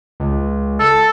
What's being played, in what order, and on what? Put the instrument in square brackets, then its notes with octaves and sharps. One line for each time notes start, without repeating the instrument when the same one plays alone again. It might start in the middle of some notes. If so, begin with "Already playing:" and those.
[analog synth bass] C#2
[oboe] A4